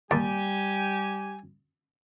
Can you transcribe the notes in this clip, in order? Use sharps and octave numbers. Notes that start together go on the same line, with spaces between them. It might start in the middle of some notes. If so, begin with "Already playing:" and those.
D#2 G3 G4 G#5 A5 D6